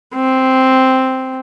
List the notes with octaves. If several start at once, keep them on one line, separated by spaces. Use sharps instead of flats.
C4